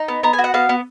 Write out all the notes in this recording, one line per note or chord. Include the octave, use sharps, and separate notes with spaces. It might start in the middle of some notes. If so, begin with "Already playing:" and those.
Already playing: D#4
B3
B3 A#5
G#5
F#4
F#5
B3 F5
B3